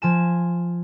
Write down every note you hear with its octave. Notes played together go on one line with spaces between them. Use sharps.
F3 G#5 E7